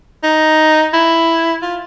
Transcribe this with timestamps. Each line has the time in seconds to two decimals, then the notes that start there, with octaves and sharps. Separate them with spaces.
0.24 D#4
0.93 E4
1.62 F4